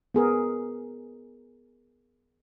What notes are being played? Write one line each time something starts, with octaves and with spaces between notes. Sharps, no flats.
B3 G#4 A#4